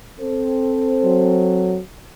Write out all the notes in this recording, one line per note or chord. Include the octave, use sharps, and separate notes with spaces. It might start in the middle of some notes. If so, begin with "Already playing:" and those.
C4 A4 C5
F#3